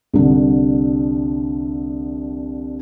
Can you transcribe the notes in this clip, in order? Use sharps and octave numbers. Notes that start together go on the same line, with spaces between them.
C2 D3